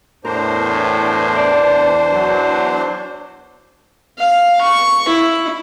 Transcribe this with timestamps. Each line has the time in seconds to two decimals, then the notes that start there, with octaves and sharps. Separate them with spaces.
0.25 E2 A2 D4 A#4 C5
1.36 D5
2.12 F#3
4.18 F5
4.61 C#6
5.08 E4